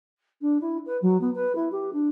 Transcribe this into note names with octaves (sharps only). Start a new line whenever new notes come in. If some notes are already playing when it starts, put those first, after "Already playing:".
D4
E4
B4
F#3
B3
B4
E4
G4
D4